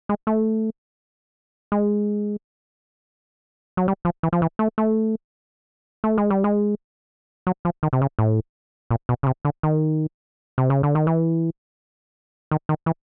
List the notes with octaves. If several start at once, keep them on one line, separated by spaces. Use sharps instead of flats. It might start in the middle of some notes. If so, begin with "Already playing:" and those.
G#3
A3
G#3
F#3
G3
F3
E3
F3
E3
A3
A3
A3
G#3
G3
G#3
F#3
F3
D#3
C3
C#3
A2
A#2
B2
C#3
C3
D3
D#3
C3
C#3
D3
D#3
E3
D#3
D#3
E3